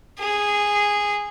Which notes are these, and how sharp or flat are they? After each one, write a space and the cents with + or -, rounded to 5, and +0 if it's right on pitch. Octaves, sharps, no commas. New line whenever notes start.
G#4 -10